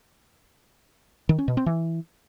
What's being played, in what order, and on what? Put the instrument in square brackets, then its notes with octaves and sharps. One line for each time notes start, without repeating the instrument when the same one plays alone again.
[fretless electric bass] D#3
C#4
B2
C4
E3